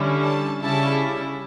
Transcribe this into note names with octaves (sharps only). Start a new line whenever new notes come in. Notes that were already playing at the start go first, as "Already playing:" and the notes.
Already playing: D3 G3 C#4 E4
A5
C#3 G3 C#4 E4 A5